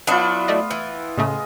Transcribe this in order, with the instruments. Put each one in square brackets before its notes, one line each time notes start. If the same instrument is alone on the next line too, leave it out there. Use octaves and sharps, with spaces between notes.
[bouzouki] F#3 D4 E4 [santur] B3 F4
[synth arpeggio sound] A3 D5 D#5
[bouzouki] E3
[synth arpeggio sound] A2 C#3 A3 [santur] G#3 D#5